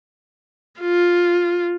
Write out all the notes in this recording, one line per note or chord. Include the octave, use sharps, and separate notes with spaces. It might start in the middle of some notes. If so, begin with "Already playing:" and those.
F4